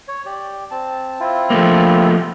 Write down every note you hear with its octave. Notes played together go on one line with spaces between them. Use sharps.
C#5
G4 D5
C4 A5
C4 E4 F4
F3 A3 A#3